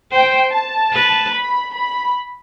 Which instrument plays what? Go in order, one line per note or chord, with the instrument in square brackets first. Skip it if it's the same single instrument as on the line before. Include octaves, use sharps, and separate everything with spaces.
[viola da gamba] C5 [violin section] G5
[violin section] A5
[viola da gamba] B4
[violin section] B5
B5